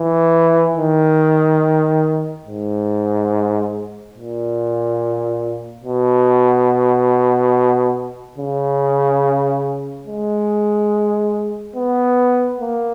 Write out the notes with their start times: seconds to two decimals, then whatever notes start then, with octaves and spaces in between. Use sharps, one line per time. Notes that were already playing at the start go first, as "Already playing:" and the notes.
Already playing: E3
0.77 D#3
2.47 G#2
4.15 A#2
5.84 B2
8.38 C#3
10.07 G#3
11.76 B3
12.61 A#3